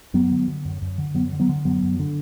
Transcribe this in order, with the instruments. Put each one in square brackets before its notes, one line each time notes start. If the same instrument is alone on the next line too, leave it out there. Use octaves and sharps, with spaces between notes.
[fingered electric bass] F#2 F#3 B3
D3
D3
F#2
F#2
D3
F#2 F#3 B3
D3
F#3 B3
D3
F#2 F#3 B3
F#2
D3